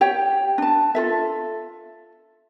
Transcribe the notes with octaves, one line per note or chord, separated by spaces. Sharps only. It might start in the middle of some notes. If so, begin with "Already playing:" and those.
G4 C#5 G5
D4 A5
F4 A4 E5